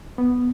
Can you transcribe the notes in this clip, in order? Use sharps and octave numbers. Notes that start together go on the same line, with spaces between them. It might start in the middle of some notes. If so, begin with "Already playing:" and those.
B3